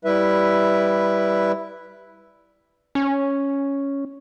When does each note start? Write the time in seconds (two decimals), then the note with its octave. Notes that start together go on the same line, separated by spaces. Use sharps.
0.05 G3 E4 B4 E5
2.95 C#4